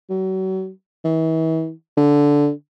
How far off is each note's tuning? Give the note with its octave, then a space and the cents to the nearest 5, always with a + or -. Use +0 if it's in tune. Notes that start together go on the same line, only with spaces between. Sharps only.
F#3 +35
E3 -40
D3 -10